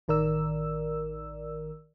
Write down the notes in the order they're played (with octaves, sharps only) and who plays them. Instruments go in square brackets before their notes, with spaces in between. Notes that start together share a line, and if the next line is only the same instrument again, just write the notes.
[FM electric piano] A1 D#3 A#4 D5 E6